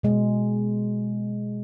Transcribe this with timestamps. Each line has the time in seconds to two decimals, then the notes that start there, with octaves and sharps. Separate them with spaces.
0.03 B2 G#3